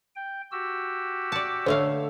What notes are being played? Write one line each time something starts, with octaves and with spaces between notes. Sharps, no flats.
G5
F#4 G4 E6
D5 A5 C#7
D3 A3 C#5 F5 E6